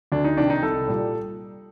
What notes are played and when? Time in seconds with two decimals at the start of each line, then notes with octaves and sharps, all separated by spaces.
0.12 D2 D4
0.24 D#4
0.37 C3 D#3 D4
0.50 D#4
0.63 C2 A4
0.88 A#2 G3